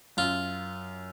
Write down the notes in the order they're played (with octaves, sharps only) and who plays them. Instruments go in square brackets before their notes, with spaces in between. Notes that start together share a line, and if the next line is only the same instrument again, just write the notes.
[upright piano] F#2 [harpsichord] F4